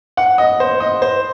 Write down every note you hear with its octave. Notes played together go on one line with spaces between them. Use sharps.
F#5
D#5
C5
D#5
C5